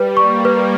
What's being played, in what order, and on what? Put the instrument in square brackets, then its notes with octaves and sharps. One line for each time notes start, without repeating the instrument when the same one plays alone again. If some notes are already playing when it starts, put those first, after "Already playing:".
Already playing: [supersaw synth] G3 [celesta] B4
[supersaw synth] A#3 [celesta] C#6
[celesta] B4